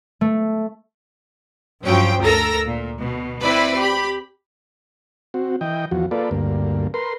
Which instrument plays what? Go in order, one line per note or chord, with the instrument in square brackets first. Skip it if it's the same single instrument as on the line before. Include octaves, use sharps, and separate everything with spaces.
[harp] A3
[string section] G2 F3 F#3 C#4 G5
D2 A4 A#4 A#5 E6 A#6
A#2
B2
C4 E4 B4 D5 B5
G4 B5
[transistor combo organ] C4 F#4
E3 D#5 G5
E2 F3 F#4
A#3 F4 A4 B4 D5
D2 G2 A#3
A#4 B4 C6